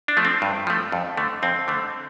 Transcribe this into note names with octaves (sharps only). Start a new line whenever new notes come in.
D4
F3 A3
C4
G2
F3 A3
F2
D3 A3
F2 C4
D3 A3